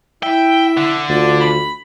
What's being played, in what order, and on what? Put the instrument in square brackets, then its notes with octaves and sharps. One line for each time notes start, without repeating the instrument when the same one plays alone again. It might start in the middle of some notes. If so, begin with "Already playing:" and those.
[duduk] E4 [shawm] E5 [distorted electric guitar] G5
[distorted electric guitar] D3
[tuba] D2 [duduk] F4 [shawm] D5
[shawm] B5